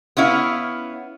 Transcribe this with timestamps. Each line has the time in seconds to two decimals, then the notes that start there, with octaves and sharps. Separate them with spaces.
0.17 B3 C#4 E4 F5